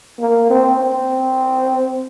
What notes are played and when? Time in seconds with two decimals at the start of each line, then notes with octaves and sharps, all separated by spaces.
0.19 A#3
0.50 C4
0.80 C4